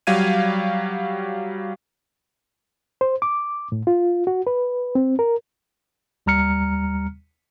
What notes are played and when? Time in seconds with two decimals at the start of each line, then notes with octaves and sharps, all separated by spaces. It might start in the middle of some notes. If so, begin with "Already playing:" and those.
0.07 F#3 G3 F5 G#6 D#7
3.01 C5
3.22 D6
3.72 A2
3.87 F4
4.27 F#4
4.47 B4
4.95 C4
5.19 A#4
6.26 D#2 G3 A#5 F6 C#7